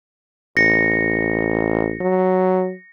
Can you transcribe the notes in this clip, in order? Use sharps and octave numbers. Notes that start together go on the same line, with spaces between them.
A1 A#6 C#7
F#3